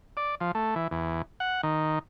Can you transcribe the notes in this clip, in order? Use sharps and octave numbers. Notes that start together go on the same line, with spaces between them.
D5
F3
A3
E3
E2
F#5
D#3